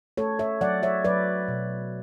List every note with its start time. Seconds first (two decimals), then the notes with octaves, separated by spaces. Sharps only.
0.17 A3 A4 C#5
0.39 C#5 E5
0.61 F#3 D5 F#5
0.83 C#5 E5
1.05 F#3 B4 D5
1.48 B2